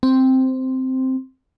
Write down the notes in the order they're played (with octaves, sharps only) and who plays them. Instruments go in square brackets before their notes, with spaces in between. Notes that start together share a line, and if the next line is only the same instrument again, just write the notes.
[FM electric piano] C4